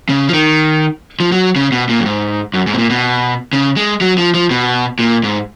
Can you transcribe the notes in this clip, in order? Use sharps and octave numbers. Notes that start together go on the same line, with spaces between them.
C#3
F3
D#3
F3
F#3
C#3
B2
A#2
F#2
G#2
F#2
G#2
B2
A#2
B2
C#3
G#3
F#3
F3
F3
B2
A#2
G#2